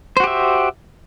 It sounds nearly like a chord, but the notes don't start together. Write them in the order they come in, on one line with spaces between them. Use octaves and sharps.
C5 F#4 G4 E5